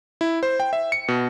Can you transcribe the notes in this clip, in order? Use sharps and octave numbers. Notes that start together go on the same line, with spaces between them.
E4
C5
G5
E5
C#7
B2